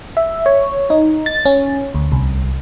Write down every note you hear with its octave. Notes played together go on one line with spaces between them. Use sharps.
E5
C#5
D#4
A6
C#4
D2
C2